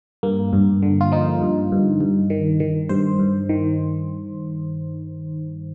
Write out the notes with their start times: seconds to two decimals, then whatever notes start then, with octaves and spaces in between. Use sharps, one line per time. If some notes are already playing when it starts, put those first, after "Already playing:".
0.23 G2 A#3
0.53 G2
0.82 D3
1.01 F4
1.12 F3 D#4
1.41 G2
1.72 G2
2.01 G2
2.30 D#3
2.60 D#3
2.89 G2 C5
3.19 G2
3.49 D#3